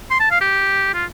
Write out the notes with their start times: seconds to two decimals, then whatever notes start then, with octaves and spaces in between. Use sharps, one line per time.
0.10 C6
0.20 A5
0.31 F5
0.41 G4
0.94 F4